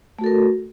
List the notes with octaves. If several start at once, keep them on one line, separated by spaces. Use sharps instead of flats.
A3 F#4 A4 A#4